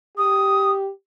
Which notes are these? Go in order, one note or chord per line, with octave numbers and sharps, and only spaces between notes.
G4 D#6